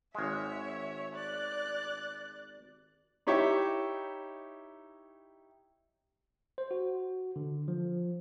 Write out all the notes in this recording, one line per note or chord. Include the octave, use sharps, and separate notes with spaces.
G#1 G#3 C#5 E5
D5 F#6 A6
D#4 E4 G4 C#5 E5
C5
F#4
D3
F3